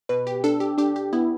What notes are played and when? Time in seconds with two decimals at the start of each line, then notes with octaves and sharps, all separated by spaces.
0.09 B2 B4
0.27 G4
0.44 D4 A4
0.60 G4
0.78 D4 G4
0.96 G4
1.13 B3 E4